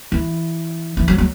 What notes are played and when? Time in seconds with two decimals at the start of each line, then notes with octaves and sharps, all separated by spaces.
0.12 E3
0.97 E3
1.08 F#3
1.18 F#3